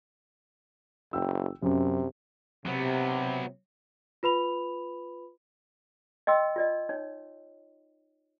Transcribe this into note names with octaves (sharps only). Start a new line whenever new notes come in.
F#1 G5 E6
F#2 C3
C3 F#3 B3
F4 B4 B5 F7
D#5 G5 C6 E6
F4 D5 D#5
D#4 C#5